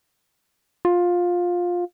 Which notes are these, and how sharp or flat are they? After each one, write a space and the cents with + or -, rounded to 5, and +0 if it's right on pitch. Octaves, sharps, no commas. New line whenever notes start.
F4 +15